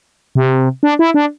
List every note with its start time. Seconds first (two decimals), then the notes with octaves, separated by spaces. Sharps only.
0.35 C3
0.83 D4
0.99 E4
1.14 D4